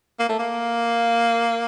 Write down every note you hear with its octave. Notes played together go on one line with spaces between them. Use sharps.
A#3
A3
A#3